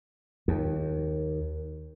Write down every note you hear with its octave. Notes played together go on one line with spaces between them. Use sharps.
D#2